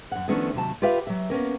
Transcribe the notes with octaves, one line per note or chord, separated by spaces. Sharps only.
F#2 F#5
D#3 F3 A3 B3 C#4 D4
D#2 C3 F#3 A5
F4 G4 B4 E5 F5
F#3 E5
A#3 B3 C#4 A#4